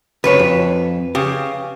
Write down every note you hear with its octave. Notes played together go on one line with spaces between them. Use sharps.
C#2 F#2 B4 C#5
F2
C#3 G4